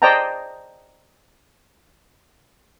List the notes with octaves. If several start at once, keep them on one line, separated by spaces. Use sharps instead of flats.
C5 D5 D#5 G5 A5 A#5